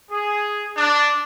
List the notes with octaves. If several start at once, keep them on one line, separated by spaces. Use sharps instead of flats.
G#4
D4